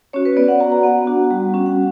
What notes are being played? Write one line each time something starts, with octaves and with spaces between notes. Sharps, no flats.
C#4 F#4 C#5
B4
B3 D5
F#5
F#4 A#5
A#5
B3 F#5
D4 F#4
G3
C#4 F#4
F#5